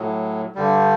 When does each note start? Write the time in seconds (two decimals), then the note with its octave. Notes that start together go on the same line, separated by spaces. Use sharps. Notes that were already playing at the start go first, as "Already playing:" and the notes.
Already playing: A2 F#3
0.55 G2 D3 G3